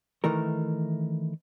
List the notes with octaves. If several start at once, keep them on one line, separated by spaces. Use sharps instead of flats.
D#3 E3 A3 A#4